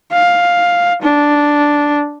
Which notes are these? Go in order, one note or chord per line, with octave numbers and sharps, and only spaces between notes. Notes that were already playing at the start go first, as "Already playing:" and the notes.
F5
D4